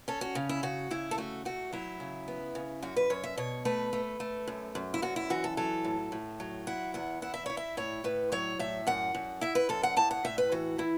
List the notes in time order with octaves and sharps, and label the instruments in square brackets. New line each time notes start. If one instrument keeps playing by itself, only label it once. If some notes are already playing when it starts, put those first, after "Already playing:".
[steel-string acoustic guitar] C#4 A4
F#4
C#3
E4
C#3 F#4
C#3 E4
A4
A3 F#4
A3 F#4
F#3 E4
C#3
B3
C#3
F#2 F#4
B4
F#2 C#5
E5
B2 C#5
A3 B4
A3
A3
F#2
F#2
E4
F#2 F#4
E4
E3 F#4
A4
F#3 A4
A2
A2
F#3
E4 F#5
E2 F#5
E4 F#5
E5
E4 C#5
E5
A2 C#5
A2 B4
F#3 C#5
A2 E5
F#2 F#5
F#2
E4 E5
B4
F#2 A4
F#5
A2 A5
F#5
A2 E5
B4
E3 F#4
E3 E4